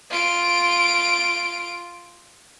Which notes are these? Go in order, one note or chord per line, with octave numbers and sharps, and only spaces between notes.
F4 D7